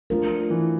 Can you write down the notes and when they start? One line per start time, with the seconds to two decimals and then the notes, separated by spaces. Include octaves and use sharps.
0.10 F3 A3 D4 F4 A#4
0.50 E3